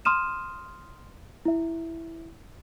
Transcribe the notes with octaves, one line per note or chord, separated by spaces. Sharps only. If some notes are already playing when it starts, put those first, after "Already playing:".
C6 D#6 F6 D#7 E7
E4 E5